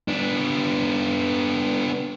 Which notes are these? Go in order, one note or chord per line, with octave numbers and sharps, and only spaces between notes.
B3 D4